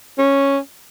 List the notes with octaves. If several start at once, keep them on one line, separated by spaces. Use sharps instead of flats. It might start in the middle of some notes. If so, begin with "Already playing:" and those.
C#4